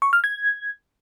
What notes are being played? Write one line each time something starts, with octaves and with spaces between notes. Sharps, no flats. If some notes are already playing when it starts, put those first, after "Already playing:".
C#6
F6
G#6